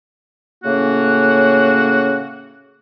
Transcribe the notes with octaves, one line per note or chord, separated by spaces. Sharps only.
A2 C#3 A#3 C#4 F#4